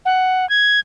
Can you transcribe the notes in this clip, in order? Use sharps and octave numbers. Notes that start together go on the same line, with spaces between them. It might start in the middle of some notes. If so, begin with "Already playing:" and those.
F#5
G#6